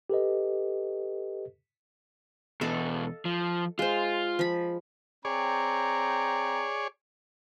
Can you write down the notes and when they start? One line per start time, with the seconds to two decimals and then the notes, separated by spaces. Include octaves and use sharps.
0.10 G4 A4 B4 D#5
2.61 E2 B2 A4 D#5 F5
3.25 F3
3.79 G#3 F4 C5
4.39 F3 B5
5.25 C4 G#4 C#5 D5 G5 A#5